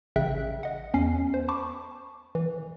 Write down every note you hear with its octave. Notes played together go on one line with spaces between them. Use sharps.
A1 C#3 E5 G5 F#6
D#5 F#5
E2 C#4 C7
C5
A5 B5 C#6 D6
E3